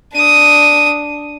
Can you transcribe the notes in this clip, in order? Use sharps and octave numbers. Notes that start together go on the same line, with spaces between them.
D4 D#6